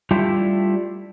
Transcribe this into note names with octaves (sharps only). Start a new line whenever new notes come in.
G3 A3 D4 E4 F4 G4